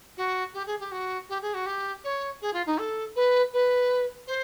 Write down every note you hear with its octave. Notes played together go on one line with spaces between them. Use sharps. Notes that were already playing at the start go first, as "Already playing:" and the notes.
F#4
G4
G#4
G4
F#4
G4
G#4
F#4
G4
C#5
G#4
F4
D#4
A4
B4
B4
C5